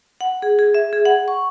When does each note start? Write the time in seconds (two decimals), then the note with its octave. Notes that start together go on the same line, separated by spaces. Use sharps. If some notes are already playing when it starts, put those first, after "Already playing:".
0.21 F#5
0.42 G#4
0.59 G#4
0.75 E5
0.93 G#4
1.05 F#5
1.28 C#6